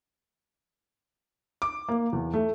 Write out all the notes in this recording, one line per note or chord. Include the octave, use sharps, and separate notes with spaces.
D6
A#3
E2
A3